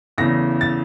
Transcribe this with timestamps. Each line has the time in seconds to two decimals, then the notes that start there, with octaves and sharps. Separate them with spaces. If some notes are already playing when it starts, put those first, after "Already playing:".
0.18 E2 C#3 E3 A3 A#6
0.61 A6